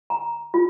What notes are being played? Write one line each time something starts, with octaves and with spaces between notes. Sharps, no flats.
A#5
F4